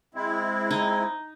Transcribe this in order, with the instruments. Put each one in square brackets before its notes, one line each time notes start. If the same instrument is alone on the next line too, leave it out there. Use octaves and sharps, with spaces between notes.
[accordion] G#3 C4 E4
[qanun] D#4